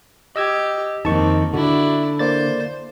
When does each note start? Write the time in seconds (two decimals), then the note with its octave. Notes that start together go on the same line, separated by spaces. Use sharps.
0.36 G4 D#5 E6 G#6
1.05 F2 D#3 A#3 C4 D#4 A5 C#6
1.54 D3 D4 E4 F#4
2.19 A#3 C5 D5 A6